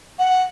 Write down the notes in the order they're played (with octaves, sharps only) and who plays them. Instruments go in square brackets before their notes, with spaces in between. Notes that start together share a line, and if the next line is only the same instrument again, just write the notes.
[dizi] F#5